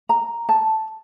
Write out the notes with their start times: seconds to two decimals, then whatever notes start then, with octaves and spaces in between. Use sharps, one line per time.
0.09 A#5
0.49 A5